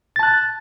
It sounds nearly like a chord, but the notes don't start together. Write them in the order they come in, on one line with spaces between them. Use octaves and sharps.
A6 A5 F#6